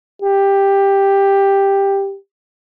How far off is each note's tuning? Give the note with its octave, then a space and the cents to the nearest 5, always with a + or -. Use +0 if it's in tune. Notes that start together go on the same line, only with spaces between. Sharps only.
G4 +10